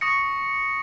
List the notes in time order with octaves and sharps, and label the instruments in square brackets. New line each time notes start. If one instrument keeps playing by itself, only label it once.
[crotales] C#6 D#6 A#6 C#7